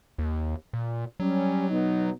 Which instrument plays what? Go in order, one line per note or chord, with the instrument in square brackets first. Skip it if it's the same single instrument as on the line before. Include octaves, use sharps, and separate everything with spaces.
[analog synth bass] D#2
A#2
[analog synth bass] F#3 [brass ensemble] G3 C#4
[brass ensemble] B2 B3 D#4